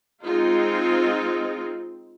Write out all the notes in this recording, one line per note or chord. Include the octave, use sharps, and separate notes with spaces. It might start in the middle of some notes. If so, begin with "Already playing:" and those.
G#3 C4 D#4 F4